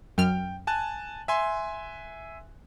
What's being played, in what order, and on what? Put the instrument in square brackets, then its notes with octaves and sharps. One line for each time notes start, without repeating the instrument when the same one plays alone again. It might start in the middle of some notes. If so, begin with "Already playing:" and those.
[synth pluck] F#2 F6 [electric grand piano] G5
[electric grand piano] G#5 A5 F#6
E5 G#5 C6